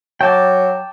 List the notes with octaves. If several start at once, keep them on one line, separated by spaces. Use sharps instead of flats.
F#3 G5 A5 D6